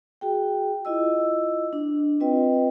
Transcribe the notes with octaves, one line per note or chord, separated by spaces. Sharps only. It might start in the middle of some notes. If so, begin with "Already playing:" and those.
F#4 G#4 G5
E4 F4 D#5 E6
D4
C4 F4 B4 D#5 G5